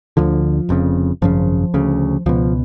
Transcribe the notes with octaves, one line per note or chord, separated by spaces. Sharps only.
D2 D3 F3
F1 F2 C#3
G#1 F#2 C#3 F3
D2 C#3
C#2 B2 F3